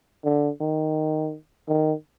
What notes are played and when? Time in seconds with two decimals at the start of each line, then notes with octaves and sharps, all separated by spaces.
0.25 D3
0.60 D#3
1.68 D#3